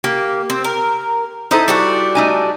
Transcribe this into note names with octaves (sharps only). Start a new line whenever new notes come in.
A#3 G4
C4
A#4
D#4 E4 A4 C5 D#5
G3 D4 F#4
A3 D#4 G#5